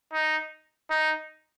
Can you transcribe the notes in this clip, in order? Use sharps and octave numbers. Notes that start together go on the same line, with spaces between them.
D#4
D#4